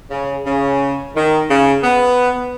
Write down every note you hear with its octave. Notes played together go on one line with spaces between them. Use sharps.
C#3
C#3
D#3
C#3
B3